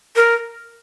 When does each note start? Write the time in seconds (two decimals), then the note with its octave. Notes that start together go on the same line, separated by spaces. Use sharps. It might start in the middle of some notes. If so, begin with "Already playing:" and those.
0.16 A#4